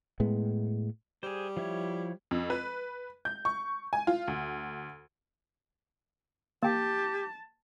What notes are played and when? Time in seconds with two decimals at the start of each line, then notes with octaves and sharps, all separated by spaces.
0.20 A2 G#3 B3
1.23 G3 G#4 C5
1.57 F3 E4 C#5
2.31 F2
2.50 B4
3.25 G6
3.45 C#6
3.93 G#5
4.07 F4
4.28 D2
6.63 A#3 G4 G5 A5